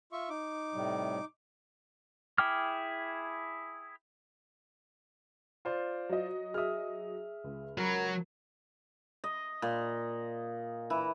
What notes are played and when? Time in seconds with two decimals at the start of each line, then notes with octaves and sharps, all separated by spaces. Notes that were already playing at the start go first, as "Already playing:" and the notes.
0.12 F4 E5 C#6
0.30 D#4 D6
0.74 A2 C3 G3
2.38 E4 G#4 G5 D6 F6
5.65 F4 C5 D5
6.09 F#3 D#5
6.54 G#4 E5 D#6 F6
7.44 C#2
7.78 F#3 A#4 A#5 B5
9.24 D#5
9.62 A#2
10.90 E3